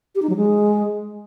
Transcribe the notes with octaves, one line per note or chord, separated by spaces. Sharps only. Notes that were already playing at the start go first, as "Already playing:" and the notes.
G4
D#4
F#3
G#3